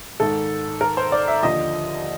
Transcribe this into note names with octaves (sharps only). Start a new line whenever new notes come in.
G#2 D#3 A4
A#4
C5
D5
E5
D#2 D3 F3 D#5